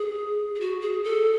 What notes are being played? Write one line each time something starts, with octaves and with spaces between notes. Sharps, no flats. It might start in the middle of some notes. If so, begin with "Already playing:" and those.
Already playing: G#4
G#4
F#4
G#4
A4